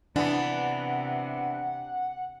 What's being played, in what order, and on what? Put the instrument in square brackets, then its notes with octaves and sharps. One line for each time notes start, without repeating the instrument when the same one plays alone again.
[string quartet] C3 [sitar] E3 B3 [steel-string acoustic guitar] D4 [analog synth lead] F#5